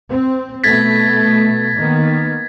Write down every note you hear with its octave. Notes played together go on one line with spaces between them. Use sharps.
C4
B2 A3 B3 G#6 A6 B6
D#3 A#3 B3